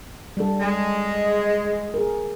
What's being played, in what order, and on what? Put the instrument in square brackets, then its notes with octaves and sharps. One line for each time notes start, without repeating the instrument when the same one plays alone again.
[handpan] G3 A4
[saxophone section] G#3
[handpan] G#4 A#4